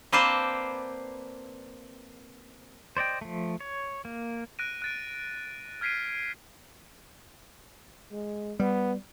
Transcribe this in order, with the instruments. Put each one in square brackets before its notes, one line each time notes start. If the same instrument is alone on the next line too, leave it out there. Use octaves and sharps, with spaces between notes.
[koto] A#3 C4 B4 C5 D5 A5
[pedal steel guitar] C5 D5 D#5 G5
F3 A3
C#5
A#3
[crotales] F#6 A#6 D7 D#7
F#6 A6 D7
F6 G#6 B6 C7 D7 D#7
[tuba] G#3
[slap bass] G3 [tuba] B3